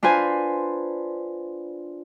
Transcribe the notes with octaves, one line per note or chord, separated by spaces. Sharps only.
D4 F4 B4 C5 G#5